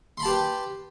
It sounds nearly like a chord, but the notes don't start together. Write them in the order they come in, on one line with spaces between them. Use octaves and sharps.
C6 B5 A5 G4 B4